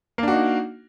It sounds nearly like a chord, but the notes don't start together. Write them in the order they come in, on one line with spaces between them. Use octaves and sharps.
A#3 D4 F#4 D#4